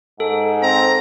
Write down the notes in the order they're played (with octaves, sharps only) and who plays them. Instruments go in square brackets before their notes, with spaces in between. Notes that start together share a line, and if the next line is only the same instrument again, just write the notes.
[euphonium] G#2 [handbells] A4
[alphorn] C4 [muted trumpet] A#5